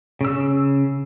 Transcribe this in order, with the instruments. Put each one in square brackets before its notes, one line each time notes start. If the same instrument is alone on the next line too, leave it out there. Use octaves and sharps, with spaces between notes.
[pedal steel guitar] C#3 E6